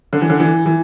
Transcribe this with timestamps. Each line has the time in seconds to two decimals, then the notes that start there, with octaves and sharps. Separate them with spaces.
0.13 D3
0.22 E3
0.30 D3
0.40 E3
0.66 E3